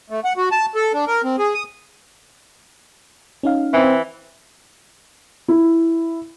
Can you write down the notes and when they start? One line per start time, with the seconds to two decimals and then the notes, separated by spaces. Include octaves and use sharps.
0.10 A3
0.24 F#5
0.37 F#4
0.52 A5
0.75 A4
0.94 D4
1.07 A#4
1.24 C4
1.39 G#4
1.54 D#6
3.43 C#4 D#4 F5
3.73 E3 C4
5.48 E4